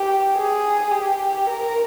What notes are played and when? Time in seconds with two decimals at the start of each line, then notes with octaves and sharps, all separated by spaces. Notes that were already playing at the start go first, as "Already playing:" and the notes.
Already playing: G4
0.36 G#4
0.91 G4
1.47 A#4